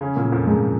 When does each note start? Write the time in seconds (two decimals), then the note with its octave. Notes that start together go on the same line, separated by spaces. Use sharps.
0.01 C#3 C#4
0.16 A#2 A#3
0.32 F2 F3
0.47 G#2 G#3